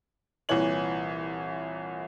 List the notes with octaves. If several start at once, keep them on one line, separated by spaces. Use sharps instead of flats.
C2 A#2 E3 C#5 F#7